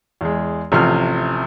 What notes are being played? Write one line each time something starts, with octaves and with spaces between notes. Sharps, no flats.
E2 G#3
A1 C3 F3 F6